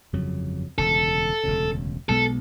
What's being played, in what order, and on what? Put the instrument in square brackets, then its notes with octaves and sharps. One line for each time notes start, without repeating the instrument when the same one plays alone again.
[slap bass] G1 F2 C#3 F#3
[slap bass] E1 D2 C#3 [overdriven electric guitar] A4
[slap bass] E1 D2 C#3
[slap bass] B1 B2 G#3 B3 [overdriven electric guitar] A4